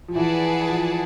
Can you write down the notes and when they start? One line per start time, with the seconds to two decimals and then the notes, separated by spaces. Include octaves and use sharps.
0.08 F3
0.15 E3 G#4 B4 D5 F#5 A5
0.69 F3